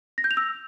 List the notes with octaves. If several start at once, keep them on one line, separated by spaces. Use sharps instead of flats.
A#6
G6
F7
E6